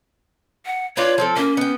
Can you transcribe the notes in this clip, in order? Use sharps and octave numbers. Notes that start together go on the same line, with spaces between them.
F#5
D4 F4 B4 C#5
F3 C4 A4
A#3 C#4
B3 G5